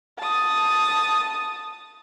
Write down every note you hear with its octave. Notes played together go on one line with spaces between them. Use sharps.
A5 D#6